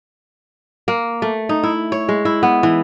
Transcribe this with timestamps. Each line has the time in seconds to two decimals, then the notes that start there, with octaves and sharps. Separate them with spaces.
0.88 A#3
1.22 A3
1.49 D#4
1.63 E4
1.92 C#5
2.09 G#3
2.25 E4
2.43 B3
2.63 E3